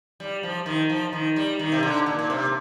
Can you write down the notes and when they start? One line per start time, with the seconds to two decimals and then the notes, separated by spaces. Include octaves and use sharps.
0.20 G3
0.43 F3
0.66 D#3
0.90 F3
1.13 D#3
1.36 G3
1.59 D#3
1.72 C3
1.83 D3
2.06 A#2
2.19 A#2
2.30 C3